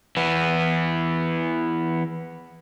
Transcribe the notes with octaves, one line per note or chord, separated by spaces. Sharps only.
E3 B3